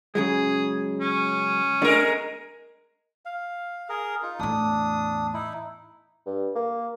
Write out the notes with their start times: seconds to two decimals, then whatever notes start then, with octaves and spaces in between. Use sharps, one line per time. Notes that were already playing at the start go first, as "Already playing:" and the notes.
0.15 C#3 F#3 G#3 G#4
1.01 C#4
1.82 G#3 A3 B3 D4 A#4
3.25 F5
3.89 G#4 A#4
4.23 D#4 F4
4.39 E2 A2 D4 D#6
5.34 D#4 E4
6.26 G2
6.55 A#3